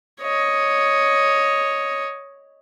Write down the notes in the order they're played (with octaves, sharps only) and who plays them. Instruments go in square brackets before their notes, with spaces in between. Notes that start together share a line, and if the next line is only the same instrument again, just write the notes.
[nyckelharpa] C#5 D#5